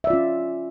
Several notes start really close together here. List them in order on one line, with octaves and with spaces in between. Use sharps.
E5 D5 F4 C#4